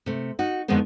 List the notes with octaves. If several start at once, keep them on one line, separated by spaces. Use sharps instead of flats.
C3 A3
D#4 F#4
F2 D3 D#3 G#3 B3 C4